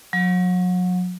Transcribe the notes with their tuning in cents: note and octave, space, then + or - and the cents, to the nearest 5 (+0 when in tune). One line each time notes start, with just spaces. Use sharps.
F#3 -35